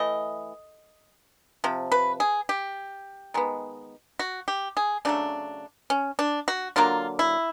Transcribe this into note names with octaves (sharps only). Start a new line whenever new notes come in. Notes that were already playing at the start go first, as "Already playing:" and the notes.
Already playing: E3 A3 D#5
C3 F3
B4
G#4
G4
D#3 G#3 B3
F#4
G4
G#4
C#3 F#3 A3 D4
C#4
D4
F#4
D3 F#3 A#3 F4
E4